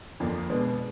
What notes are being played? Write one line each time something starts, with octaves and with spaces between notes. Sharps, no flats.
F2 D3 F3 A#3 D4
B2 G#3 B3 D4